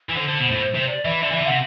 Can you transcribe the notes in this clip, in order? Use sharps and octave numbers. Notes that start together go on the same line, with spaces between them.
E3
D3 C5
D3
B2
A2
C3
D5
E3 E5
D3 D5
E3 E5
D3
C3 F#5